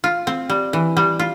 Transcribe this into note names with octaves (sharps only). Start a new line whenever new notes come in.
F4
C4
G3
E3
G3
F4